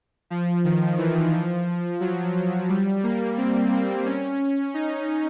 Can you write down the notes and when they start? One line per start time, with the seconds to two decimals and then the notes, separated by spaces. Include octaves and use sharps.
0.30 F3
0.64 D#3
0.98 E3
1.33 F3
2.01 F#3
2.69 G3
3.03 A#3
3.37 C4
3.71 C4
4.06 C#4
4.74 D#4